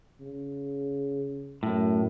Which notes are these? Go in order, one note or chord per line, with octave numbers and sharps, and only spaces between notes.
C#3
F#2 A2